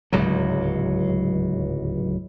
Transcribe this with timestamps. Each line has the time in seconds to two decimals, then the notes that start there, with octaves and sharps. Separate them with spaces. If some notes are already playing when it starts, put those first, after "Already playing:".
0.13 D1 C#2 G#2 F#3